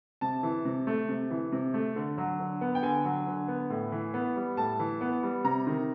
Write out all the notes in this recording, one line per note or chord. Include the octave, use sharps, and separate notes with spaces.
C3 A5
E3
C3
A3
C3
E3
C3
A3
D3
F#3
D3
B3
G5
D3 G#5
F#3
D3
B3
A2
E3
B3
G3
A2 A5
E3
B3
G3
C3 A#5
D#3